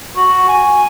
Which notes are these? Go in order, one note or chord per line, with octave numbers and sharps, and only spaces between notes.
F#4
G#5